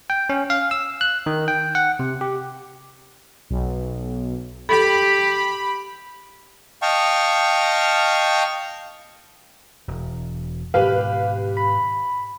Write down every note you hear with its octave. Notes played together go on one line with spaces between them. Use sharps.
G5
C#4
F5
E6
F#6
D#3
G5
F#5
C3
G4
B1
G4 A4 B5
D#5 F5 G5 A5 C#6
E1
G#2 B2 D#3 G4 B4 F5
B5